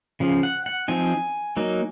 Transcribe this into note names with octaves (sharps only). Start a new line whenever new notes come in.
C#3 F3
F#5
F#5
F3 C4 D#4 G#5
F#3 A#3 D#4